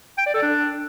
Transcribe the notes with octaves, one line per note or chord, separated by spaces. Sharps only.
G5
D5
A4
D4